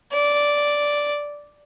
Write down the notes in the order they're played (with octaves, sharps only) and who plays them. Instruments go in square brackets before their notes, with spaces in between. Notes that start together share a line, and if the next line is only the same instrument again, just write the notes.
[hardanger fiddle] D5